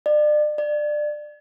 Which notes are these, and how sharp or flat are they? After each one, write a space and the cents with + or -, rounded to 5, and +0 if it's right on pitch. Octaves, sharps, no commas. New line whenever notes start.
D5 +35
D5 +20